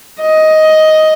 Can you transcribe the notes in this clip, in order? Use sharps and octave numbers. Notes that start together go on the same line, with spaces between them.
D#5